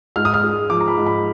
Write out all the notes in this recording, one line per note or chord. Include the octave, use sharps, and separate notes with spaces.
G#2 F6
D#6
F6
G#3
F3 D6
A#5
B5
G#2
B5